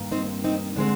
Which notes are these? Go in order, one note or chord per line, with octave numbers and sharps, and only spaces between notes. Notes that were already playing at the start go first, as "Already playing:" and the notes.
Already playing: G2 D#3 A#3
C4 D#4
C4 D#4
D3 G#3 C4 D4